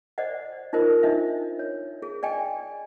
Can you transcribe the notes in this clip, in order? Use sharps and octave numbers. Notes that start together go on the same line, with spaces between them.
C5 D5 D#5 F#5
D#4 F4 A#4 C5 D#5
D4 D#4 D#5 E5
C#5
G#4
D5 D#5 G5 G#5